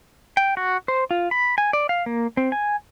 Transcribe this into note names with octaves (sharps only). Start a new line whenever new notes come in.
G5
F#4
C5
F4
B5
G#5
D5
F5
A#3
C4
G#5